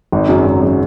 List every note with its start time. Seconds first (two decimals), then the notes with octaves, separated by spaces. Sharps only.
0.12 G#1
0.29 F#2 C#3 F#3
0.45 G#1
0.62 C#3 F#3